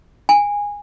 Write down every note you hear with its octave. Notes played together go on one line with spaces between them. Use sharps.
G#5